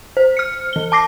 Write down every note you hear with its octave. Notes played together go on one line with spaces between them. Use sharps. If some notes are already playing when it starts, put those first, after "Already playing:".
C5
F6 C#7
E3 G7
A5 D6 A#6 C7